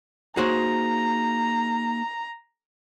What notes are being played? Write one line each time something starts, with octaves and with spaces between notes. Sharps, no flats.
A#3 D#4 F#4 G#4 C5 C#5 A#5